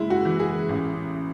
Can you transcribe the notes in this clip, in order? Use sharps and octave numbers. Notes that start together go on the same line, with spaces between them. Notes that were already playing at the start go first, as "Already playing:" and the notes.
Already playing: F#1 G#3 E4
F#4
E3
G#4
A1